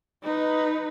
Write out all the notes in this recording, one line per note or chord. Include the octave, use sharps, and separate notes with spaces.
D#4 B4